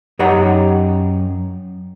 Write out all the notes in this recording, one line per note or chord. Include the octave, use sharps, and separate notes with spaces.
F#2 D#4 G4 C#5 F#5 A#5